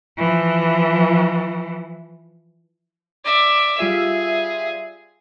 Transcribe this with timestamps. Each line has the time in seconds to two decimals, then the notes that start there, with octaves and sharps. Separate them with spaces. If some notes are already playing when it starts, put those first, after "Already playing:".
0.18 E3 F3
3.25 D5 E5
3.79 G3 F4 G#4 E5